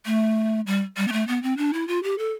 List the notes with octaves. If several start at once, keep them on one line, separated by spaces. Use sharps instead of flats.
A3
G3
G3
B3
A3
B3
C4
D4
E4
F4
G4
A4